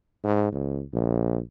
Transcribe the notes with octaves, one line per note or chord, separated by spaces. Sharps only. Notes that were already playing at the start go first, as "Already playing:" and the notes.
G#2
C#2
A#1